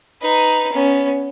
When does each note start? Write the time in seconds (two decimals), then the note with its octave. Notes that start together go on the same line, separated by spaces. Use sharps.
0.21 D#4 B4
0.72 B3 C#4